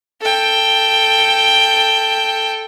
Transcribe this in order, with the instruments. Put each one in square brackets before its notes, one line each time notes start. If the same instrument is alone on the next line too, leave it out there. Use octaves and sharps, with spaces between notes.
[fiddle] A4 G5